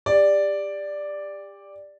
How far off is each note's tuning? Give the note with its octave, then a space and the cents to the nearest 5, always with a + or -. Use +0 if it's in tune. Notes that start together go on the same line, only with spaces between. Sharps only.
G4 +35 D5 +0